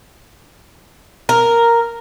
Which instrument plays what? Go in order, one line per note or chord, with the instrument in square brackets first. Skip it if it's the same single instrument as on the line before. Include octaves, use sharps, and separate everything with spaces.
[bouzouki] A#4